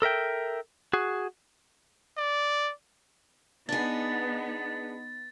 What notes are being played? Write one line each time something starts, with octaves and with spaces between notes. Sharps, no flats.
A4 A#4 E5 G5
F#4 G#4
D5
B3 D4 D#4 G#4 A6